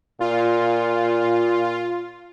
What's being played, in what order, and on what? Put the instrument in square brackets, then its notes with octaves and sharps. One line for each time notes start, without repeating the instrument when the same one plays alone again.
[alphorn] A#2 [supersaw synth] F4